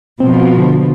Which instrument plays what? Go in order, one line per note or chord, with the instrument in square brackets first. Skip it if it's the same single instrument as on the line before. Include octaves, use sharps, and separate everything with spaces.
[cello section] B2 F3 [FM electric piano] C4
[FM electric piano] D3